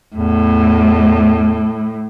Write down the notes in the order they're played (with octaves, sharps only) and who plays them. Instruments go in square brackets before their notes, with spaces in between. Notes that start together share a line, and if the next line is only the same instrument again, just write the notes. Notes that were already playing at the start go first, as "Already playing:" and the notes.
[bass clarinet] E2 [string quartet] A2